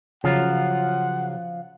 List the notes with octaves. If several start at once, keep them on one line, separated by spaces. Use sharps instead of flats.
C#3 F3 F#3 F4 F#5